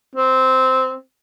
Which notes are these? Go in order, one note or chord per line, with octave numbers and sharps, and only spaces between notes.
C4